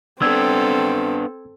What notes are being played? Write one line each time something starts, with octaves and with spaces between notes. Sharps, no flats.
B3 C4 D4 A4 E6 G#6